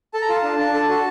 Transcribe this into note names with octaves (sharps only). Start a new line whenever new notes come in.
A4 A5
A#5
F4 A5
D4
D4
A4
F#4